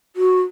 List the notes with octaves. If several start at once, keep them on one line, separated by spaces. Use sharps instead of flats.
F#4